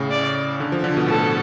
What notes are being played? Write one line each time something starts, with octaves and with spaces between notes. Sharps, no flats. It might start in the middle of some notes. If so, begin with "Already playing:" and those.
Already playing: A2 C#3
D5
D3
F3
D3
B2
A2 A4